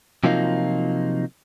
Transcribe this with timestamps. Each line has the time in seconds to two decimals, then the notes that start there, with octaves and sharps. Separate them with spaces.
0.24 C3 F3 F#3 A#3 D#4 F4